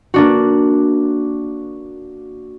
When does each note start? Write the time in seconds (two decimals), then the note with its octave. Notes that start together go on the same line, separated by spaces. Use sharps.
0.14 A#3 D4 F#4